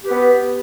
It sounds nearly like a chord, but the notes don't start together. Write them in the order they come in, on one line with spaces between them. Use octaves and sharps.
G4 B4 B3